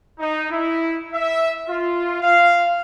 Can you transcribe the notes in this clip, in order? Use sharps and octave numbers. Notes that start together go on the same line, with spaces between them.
D#4
E4
E5
F4
F5